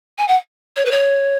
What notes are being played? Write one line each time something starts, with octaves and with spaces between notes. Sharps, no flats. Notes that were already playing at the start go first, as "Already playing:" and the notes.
G#5
F#5
C#5
B4
C#5